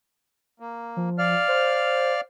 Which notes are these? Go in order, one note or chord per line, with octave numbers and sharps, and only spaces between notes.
A#3
F3
D5 F5 F6
C5